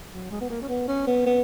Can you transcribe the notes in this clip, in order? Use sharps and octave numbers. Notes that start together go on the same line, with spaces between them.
F#3
G#3
B3
A#3
C#4
B3
C#4
B3
B3